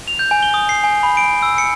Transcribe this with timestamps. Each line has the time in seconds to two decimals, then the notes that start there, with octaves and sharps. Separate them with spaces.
0.08 F7
0.19 G6
0.31 G#5
0.43 G7
0.54 D#6
0.69 C7
0.84 G#5
1.03 B5
1.17 D7
1.43 E6
1.58 C#7